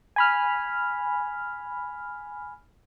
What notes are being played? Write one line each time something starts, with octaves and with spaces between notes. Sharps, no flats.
G#5 B5 F6